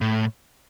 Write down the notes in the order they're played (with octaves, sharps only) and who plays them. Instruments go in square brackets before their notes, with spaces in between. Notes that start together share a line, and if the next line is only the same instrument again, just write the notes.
[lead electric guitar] A2